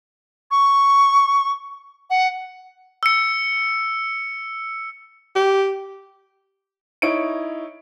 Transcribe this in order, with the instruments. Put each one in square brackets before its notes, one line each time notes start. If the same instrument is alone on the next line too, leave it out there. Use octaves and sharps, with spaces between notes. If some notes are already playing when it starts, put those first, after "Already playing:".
[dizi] C#6
F#5
[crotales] E6 C#7
[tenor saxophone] G4
[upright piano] D#4 E4 C#5 D7